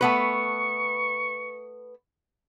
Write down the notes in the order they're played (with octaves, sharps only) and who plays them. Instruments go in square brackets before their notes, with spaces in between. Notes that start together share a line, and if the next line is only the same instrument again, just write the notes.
[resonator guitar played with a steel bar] A3 B3 B4 [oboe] C#6